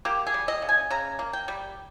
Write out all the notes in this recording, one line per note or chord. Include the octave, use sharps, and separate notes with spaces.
A#3 G4
G#4
G3
D#5
C#3
G#5
C#3 A#5
A#3
G5
G3